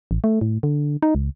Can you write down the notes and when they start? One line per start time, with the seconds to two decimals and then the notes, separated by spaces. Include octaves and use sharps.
0.11 A1
0.24 A3
0.41 A2
0.63 D3
1.02 D#4
1.15 C#2